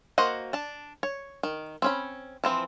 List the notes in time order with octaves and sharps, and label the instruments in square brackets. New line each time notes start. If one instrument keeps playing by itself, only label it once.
[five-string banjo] A#3 F#4 C5 D#5 F#5
D4 A5
C#5
D#3
C4 C#4 B5
E3 F3 C4